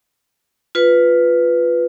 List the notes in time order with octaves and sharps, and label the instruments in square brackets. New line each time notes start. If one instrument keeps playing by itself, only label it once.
[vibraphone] F4 B4